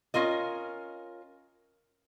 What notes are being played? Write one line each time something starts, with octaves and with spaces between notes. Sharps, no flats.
C#4 F4 A#4 D#5